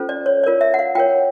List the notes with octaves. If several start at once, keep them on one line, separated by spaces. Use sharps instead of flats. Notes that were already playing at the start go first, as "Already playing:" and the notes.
Already playing: C#4 F4 A4 C5
D5
C#5
F4 A#4 C#5 D5
E5
F#5
F5
F4 A#4 C#5 G5